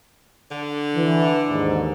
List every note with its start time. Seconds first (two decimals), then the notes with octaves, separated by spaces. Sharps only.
0.51 D3
0.96 E3
1.49 D#2 G#2